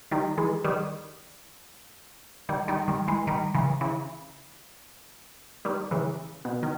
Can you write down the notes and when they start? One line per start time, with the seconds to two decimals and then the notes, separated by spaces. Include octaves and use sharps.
0.11 D#3 G3
0.38 E3 G#3
0.64 D#3 G3
2.49 D#3 G3
2.68 D#3 G3
2.88 D#3 G3
3.08 E3 G#3
3.27 D#3 G3
3.54 C#3 E3
3.81 C#3 E3
5.65 D#3 G3
5.91 C#3 E3
6.45 B2
6.63 D#3